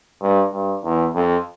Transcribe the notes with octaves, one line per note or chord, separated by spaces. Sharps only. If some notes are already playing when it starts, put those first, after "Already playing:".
G2
G2
E2
F2